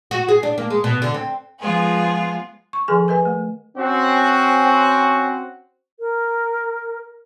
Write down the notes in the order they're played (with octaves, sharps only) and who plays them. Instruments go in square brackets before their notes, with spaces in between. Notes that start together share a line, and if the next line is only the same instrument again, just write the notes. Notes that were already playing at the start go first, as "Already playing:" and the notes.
[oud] F#4
G#4
D4
A#3
G#3
B2
D3
C4
[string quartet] F3 G#3 B3 F4 G#4
[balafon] C#6
D#3 F3 G#4 A4 G#5
A#4 B4 D#5 G#5
A3
[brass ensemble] C4 C#4 F#4
[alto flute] A#4